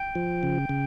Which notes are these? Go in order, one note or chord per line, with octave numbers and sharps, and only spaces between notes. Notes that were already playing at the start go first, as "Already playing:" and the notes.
Already playing: G5
F3
C#3
C#3